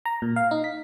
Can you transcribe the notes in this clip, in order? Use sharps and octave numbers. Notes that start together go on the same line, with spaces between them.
A#5
A#2
F5
D#4
B6